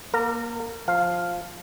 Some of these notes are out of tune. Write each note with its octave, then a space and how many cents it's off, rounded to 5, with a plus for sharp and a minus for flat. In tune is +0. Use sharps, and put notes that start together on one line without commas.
A#3 +15 A#4 -30
F3 +5 F5 +0